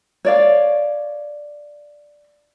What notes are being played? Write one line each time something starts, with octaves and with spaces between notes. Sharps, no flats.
C#5 D5 F5